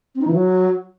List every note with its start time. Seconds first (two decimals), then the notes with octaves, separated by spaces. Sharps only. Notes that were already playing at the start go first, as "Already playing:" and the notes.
0.15 C4
0.21 D#4
0.27 E3
0.34 F#3